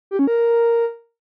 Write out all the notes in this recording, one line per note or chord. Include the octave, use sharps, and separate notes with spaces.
G4
C#4
A#4